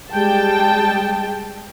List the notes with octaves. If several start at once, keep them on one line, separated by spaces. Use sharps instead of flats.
G3 G#3 G5 A5